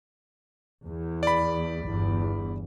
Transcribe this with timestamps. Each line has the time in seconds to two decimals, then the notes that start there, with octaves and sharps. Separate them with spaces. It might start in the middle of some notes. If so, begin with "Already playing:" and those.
0.85 E2
1.23 D5 B5
1.85 G1 E2